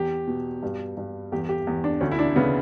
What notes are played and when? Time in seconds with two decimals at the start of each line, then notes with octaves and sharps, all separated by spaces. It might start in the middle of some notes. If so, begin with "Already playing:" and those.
Already playing: E2 G4
0.28 B2
0.63 G2
0.97 G2
1.32 E2 G4
1.49 G4
1.67 E2
1.84 D4
2.01 D2 C#4
2.12 E4
2.19 D4
2.36 C#3 B3